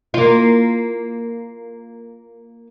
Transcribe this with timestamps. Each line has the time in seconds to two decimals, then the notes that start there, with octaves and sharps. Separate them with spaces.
0.14 A#3 F4